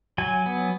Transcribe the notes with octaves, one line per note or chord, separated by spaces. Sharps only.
F#3 G#5
B3